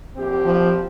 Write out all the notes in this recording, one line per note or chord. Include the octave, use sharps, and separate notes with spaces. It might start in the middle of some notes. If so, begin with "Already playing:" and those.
A#1 C4 G4
F3